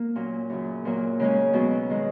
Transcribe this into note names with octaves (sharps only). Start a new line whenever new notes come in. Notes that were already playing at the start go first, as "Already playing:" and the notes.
Already playing: A#3
A#2 F#3 C#4
F#2 C#3 F#3
A#2 F#3 A#3
C#3 G#3 C#4
B2 F#3 C#4
D#3 G#3